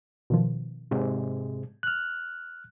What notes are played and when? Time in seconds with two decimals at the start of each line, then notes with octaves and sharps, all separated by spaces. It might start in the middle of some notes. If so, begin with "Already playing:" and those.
0.30 B2 D#3 F3
0.91 G#2 C3 G#3
1.83 F6 F#6